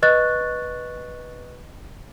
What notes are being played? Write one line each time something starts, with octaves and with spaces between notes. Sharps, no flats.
B4 D#5 C#6 F#6 A6